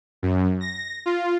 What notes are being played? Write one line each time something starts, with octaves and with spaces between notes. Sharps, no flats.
F#2
A#6
F4